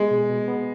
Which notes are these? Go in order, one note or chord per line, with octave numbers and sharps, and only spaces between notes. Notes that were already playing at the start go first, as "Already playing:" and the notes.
Already playing: G#3 B3
B2
B2
B3